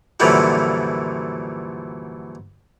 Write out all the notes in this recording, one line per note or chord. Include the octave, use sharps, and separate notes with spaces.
F#2 A#2 D3 E3 F3 G3